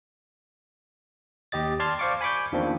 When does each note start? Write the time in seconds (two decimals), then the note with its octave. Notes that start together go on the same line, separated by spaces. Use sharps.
1.52 D#2 G4 D#5 A6
1.80 D5 A5 C6 F6 G#6 A6
1.99 C5 D5 F5 C#6 D6
2.21 G#5 B5 C#6 D6 G6
2.52 E2 D#3 F3 A#3 C4 D4